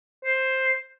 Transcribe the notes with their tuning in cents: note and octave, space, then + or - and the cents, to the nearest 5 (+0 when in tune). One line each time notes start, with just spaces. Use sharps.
C5 +5